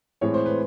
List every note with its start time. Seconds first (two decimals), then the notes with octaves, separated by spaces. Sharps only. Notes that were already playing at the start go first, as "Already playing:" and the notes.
0.21 A2 E3 G#3 C4 C#5
0.34 C5
0.46 B4